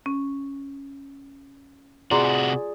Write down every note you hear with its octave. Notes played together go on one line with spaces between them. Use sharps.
C#4
C3 F4 F#4 G#4 D5 A#5 C6 D6